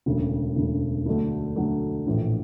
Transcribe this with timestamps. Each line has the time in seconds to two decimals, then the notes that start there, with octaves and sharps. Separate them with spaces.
0.06 E1 D2 C#3
0.56 E1 D2 C#3
1.06 D2 D3 F#3 A3
1.56 D2 D3 F#3 A3
2.07 A#1 A2 E3